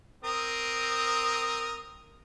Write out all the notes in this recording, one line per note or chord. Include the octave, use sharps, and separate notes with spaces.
C4 A#4 D#6